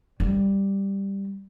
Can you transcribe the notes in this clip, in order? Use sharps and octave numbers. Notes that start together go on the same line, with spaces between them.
G3